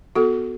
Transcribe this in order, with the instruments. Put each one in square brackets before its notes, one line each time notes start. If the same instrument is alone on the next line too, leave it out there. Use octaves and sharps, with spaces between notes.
[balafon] B3 F#4 A4